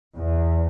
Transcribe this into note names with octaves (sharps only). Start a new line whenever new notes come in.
E2